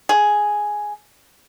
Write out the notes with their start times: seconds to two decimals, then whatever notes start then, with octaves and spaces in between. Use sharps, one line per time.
0.09 G#4